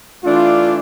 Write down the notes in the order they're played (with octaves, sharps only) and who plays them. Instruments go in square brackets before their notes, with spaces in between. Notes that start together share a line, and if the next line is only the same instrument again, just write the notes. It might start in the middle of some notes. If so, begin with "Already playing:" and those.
[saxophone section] E3 A3 D4 [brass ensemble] F4